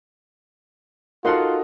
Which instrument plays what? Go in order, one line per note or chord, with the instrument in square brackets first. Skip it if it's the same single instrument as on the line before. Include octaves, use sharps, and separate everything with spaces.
[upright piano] D#4 F#4 A4 [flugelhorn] F4 [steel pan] A#4 F#5 C6